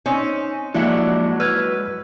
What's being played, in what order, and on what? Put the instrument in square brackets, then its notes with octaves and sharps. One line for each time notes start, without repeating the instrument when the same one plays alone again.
[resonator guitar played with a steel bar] C4 C#4 D#4
[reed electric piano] F3 A#3 E4 [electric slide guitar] F#3 G#3 [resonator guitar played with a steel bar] D4 E5 F#5
[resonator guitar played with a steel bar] B4 [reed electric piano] E6 F6 G#6